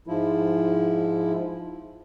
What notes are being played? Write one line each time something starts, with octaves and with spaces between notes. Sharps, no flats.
G#2 F3 E4